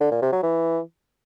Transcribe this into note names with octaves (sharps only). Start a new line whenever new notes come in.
D3
A#2
C3
F#3
E3